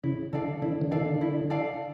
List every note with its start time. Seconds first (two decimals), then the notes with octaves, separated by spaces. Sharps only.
0.03 C#3 E4
0.33 D3 A4 D5 F5
0.62 D3 E4
0.81 D3
0.91 D#3 A4 D5 F5
1.00 D3
1.21 E4
1.50 A4 D5 F5